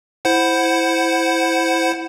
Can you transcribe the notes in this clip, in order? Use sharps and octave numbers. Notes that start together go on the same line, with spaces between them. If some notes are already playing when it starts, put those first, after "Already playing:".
E4 C5 F#5